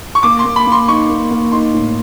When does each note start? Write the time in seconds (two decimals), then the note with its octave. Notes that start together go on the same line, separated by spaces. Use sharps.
0.15 C#6
0.23 A#3 D6
0.39 C6
0.45 A#3
0.56 B5
0.67 A#3
0.72 C6
0.88 D#4 C#6
1.09 A#3
1.31 A#3
1.52 D#4 C6
1.74 A2